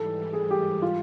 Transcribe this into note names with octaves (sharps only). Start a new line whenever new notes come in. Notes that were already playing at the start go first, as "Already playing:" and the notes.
Already playing: G#2 E3 G3 A4
G#4
G4
F4